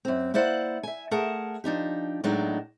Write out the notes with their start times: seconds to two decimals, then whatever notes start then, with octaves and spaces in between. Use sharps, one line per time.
0.05 F#2 C4
0.34 A#3 E4 C5 D5 F#5
0.83 E5 G#5
1.11 A3 G#4 A#4 F#5 A5
1.64 F3 D4 D#4 G4
2.24 A2 F#3 G#3 B3 D4 D#4